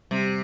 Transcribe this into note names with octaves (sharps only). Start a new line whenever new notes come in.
C3 G3